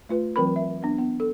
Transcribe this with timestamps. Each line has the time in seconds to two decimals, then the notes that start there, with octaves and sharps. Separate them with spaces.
0.09 A3 F4 B4
0.36 E3 F#3 C4 A#4 B4 B5
0.56 E5
0.83 B3 D4
0.98 B3
1.20 A4